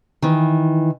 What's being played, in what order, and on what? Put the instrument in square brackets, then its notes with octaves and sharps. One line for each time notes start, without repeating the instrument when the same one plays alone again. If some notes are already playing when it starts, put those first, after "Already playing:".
[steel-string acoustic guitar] D#3 E3